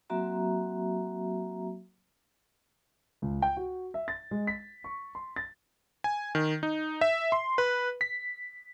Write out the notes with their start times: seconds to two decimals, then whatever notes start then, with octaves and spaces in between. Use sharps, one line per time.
0.10 F#3 A#3 C4 F#4 E5 A#5
3.22 C#2
3.42 G5
3.57 F#4
3.94 E5
4.08 A6
4.31 G#3
4.47 B6
4.84 C#6
5.15 C6
5.36 A6
6.04 G#5
6.35 D#3
6.63 D#4
7.01 E5
7.32 C6
7.58 B4
8.01 B6